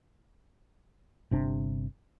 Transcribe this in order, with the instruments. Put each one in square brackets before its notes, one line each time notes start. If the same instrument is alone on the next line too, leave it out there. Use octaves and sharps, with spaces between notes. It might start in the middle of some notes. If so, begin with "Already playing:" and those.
[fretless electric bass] G1 C3 D4